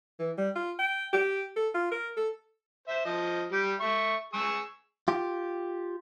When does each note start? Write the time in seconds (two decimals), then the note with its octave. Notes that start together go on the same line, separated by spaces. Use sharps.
0.19 E3
0.37 G3
0.55 F4
0.79 G5
1.13 G4
1.56 A4
1.74 F4
1.91 A#4
2.17 A4
2.88 C5 E5
3.05 F3 D#5
3.52 G3 G4
3.80 E5 C#6
4.33 G#4 C#6 E6
5.08 F4 G4